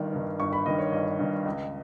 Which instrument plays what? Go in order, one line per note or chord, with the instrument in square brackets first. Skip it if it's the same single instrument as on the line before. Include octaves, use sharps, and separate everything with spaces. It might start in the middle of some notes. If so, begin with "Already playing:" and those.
Already playing: [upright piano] G1 G2 D#3
G2 D#3
G1 C#6
B5
G2 D#3 D#5
C#5
G1 D#5
G2 D#3
C#2